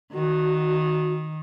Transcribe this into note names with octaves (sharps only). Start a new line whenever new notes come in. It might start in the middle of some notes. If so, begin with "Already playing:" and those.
D#3 F#4